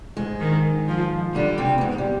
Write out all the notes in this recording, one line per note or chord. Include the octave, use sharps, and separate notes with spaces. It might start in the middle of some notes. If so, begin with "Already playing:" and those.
G#2 G#3
D#3
F3
D3 G3 D4
C3 C4
B3
G#2 G#3
G3